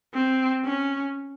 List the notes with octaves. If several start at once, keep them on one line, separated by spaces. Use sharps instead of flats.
C4
C#4